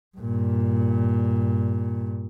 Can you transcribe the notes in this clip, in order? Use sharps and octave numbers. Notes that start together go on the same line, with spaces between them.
G2 A#2